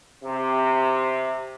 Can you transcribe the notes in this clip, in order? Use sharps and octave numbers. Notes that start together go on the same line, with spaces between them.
C3